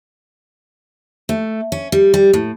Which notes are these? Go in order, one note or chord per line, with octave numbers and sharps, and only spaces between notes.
A3
C#4
G3
G3
A2